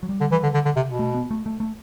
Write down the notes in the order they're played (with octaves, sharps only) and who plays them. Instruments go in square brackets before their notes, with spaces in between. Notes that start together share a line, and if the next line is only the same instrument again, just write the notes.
[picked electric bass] F#3
G3
[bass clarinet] D3
E3
D3
D3
D3
C3
B2
[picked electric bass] A3
B3
A3
A3
A3